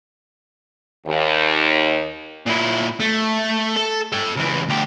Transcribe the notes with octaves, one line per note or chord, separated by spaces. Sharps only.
D#2
A#2 E4
A3
A4
A4 G5
C#2 E3
D2 G4